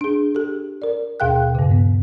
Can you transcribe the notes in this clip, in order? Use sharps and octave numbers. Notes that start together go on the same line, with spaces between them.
D4 G#4
G4 A4
A#4 D5
D#2 B2 G#4 F5 G5 F#6
G2 C#3
B3